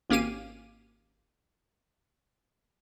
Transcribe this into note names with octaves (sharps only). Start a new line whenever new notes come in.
G#1 A#3 C#4 G4 F5 D#7